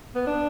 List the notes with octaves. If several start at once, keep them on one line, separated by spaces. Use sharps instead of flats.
B3
D4